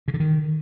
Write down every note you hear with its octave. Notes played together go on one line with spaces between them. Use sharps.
C#3
D3
D#3